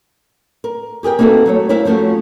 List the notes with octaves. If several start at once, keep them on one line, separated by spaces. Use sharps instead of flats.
A#4
G4 G#4 A#4 G5
A#3 C4 D#4 F#4 A4 B4
F#3 A3 C#5
E4 A#4 C5 E5 F5
F3 A3 C#4 F4 F#4